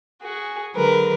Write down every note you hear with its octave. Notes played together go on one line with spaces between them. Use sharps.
F#4 G#4
D3 F#3 G#3 A#4 B4